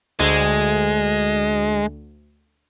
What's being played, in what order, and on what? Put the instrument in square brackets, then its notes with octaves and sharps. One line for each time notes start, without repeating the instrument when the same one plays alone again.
[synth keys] D2 [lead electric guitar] G#3